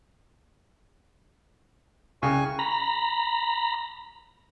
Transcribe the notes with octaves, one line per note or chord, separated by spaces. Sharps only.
C2 C#3 G5 G#5 C#6
A#5 B5